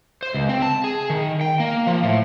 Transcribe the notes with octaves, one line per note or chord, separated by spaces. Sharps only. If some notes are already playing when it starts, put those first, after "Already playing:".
C5
C#2
C4
A5
G#4
D#3
G5
A#3
F3
A2